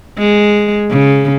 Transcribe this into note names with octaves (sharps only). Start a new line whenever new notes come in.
G#3
C#3